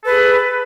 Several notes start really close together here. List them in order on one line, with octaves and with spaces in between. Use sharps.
A4 B4 G#4